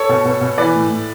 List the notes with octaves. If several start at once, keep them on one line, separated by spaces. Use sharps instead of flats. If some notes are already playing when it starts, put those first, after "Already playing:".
Already playing: A4 C#5
B2
B2
B2
E3 B4 D5
A2
A2